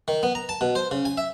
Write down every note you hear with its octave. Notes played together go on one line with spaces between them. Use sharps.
D#3
B3
A#5
A5
B2
C5
C#3
G#5
E5